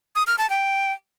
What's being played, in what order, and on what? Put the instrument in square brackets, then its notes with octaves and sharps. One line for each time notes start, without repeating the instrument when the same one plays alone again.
[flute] D#6
F6
A5
G5